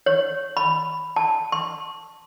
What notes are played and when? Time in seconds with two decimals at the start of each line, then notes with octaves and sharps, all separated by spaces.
0.06 C#5
0.57 B5
1.16 A5
1.52 C6